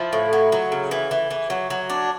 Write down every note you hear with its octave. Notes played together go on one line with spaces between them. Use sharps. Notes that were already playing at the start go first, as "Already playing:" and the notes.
Already playing: F3 E4
A2
F#3
F#3
C#3
E3
E3
E3
F#3
F#3
D4